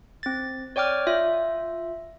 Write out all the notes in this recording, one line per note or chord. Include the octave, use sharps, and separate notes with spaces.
C4 A6
C#5 D5 G5 D6 F6
F4 E5